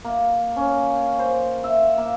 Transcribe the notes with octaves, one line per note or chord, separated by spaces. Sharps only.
A#3
C#4
C5
E5
A#3